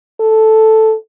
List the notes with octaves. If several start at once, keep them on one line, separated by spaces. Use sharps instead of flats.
A4